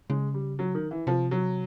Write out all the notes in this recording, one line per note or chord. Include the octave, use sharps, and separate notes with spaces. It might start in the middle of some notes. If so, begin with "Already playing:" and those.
C#3 G#3
G3
F#3
D#3
E3
C3 F3
F#3